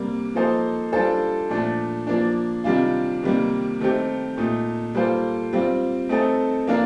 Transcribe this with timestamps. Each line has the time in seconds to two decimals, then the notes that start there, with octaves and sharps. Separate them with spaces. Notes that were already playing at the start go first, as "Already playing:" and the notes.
Already playing: C3 G3 A#3
0.35 F3 A#3 D#4 A4 C5
0.92 G3 D4 F4 A4 C5
1.50 A#2 F3 A3 D4
2.07 F3 A#3 D4
2.64 C3 D#3 G3 D4 F4
3.23 C3 D#3 G3 A#3
3.80 D#3 A3 C4 G4
4.37 A#2 A3 D#4
4.95 G3 A#3 F4 A4 C5
5.53 G3 C4 F4
6.09 A3 C4 D#4 A4
6.68 F3 A#3 D4 F4 A#4